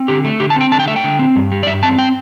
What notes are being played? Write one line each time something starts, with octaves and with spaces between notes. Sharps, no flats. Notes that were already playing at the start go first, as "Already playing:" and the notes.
Already playing: C4
D3 G4
A3
D3 G4
A5
C4 G5
D3 A5
G5
A3 E5
G5
D3
C4
G2
G3
D5
G2 E5
C4 A5
G5